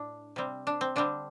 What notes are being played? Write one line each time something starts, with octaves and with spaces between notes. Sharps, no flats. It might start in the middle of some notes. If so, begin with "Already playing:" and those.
Already playing: A2 D4
C3 G3 C4
D4
C4
D3 G3 C4 D4